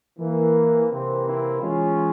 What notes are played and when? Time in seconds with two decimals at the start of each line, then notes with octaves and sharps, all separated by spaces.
0.19 E3 A#3
0.90 C3 E3 A#3 C4
1.25 C4 E4
1.60 E3 G#3 C#4 F4